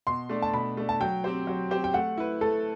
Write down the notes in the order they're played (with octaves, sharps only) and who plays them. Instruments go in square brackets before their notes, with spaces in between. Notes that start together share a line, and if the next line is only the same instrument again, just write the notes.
[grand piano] B2 [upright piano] C6
[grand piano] A3 D4
[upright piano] A5
[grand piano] B2 [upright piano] B5
[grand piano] A3 D4
[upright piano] A5
[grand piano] F#3 [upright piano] G5
[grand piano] C4 G4 C5
F#3
C4 G4 C5
[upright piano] G5
[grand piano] A3 [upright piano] F#5
[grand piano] E4 B4
[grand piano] A3 [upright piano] A4